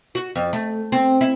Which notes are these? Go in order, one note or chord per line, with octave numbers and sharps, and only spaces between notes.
F#4
F2
A3
C4
E4